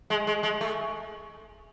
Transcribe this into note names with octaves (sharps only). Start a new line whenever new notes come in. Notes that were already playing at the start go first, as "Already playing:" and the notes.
G#3
G#3
G#3
A3